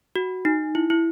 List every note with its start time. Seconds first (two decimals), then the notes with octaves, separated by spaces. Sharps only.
0.15 F#4
0.45 D#4
0.75 E4
0.90 E4